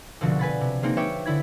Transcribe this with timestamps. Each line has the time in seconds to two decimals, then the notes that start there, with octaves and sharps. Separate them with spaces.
0.21 C2 B2 D3 F3 C4 F#4
0.39 B4 G#5 B5 A6
0.61 C3
0.83 G#3 A#3 C4 D#4
0.97 B4 C#5 E5 G5 D6
1.26 D3 E4 B5 G#6